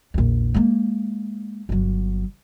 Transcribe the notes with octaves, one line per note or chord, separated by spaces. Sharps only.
A#1 E2
G#3 A#3
G1 F#3